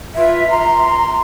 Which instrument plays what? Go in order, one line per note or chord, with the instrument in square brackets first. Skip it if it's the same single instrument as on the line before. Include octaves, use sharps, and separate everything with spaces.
[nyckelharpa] F4 B4 [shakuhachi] E5
[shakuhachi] A#5 [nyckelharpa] C6